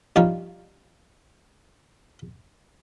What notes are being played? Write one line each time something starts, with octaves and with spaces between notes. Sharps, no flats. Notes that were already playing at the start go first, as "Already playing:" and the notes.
G2 F3 G3 C#4 D#4 F4